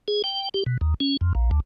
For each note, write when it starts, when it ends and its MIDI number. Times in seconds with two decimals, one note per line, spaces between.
0.08 0.22 68
0.24 0.49 79
0.54 0.64 67
0.66 0.77 47
0.81 0.94 39
1.00 1.17 61
1.21 1.33 41
1.35 1.50 34
1.51 1.60 38